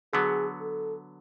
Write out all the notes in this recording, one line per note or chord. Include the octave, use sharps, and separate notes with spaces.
D3 F#3 B3 G#4
A4